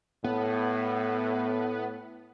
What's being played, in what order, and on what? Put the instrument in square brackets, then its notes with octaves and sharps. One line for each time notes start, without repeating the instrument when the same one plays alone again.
[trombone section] A2 [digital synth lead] B3